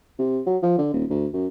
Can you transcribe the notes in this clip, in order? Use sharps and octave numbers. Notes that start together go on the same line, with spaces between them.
C3
F#3
F3
D3
D#1
D2
F#2